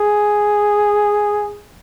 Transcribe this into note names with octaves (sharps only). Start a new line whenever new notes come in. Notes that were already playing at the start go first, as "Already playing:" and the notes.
Already playing: G#4